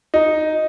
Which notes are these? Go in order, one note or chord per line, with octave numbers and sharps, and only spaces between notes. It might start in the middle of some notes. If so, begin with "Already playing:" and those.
D#4